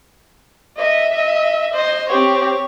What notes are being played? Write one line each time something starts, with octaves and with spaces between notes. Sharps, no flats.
D#5 E5
D#5
C5 D#5
C4 G4 C#5